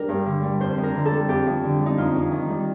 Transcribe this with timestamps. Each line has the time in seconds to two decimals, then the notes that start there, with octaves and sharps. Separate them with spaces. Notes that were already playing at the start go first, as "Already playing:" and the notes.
Already playing: G3 D4 A#4
0.09 G2
0.25 D3
0.43 G3
0.60 F2 C5
0.77 F2
0.83 A#4
0.94 D3
1.05 A4
1.11 G3
1.28 F2 G4
1.47 F2
1.64 D3
1.80 G3
1.86 D#4
1.97 F2 F4
2.15 F2
2.32 D#3
2.49 G3